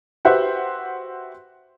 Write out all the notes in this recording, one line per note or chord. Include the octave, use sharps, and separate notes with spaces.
F#4 G4 B4 C5 E5 F#5